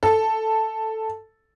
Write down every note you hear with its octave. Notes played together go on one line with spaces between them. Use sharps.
A4